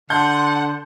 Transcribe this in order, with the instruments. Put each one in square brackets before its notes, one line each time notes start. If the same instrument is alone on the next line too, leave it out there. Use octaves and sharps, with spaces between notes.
[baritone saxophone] D3 [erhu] F#5 [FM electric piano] A5 C6 [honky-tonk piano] G6